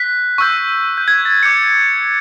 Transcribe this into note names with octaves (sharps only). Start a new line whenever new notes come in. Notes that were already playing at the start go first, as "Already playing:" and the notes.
Already playing: F#6 B6
C#6 E6 G6
G6
G#6
A6
D6 G6 C#7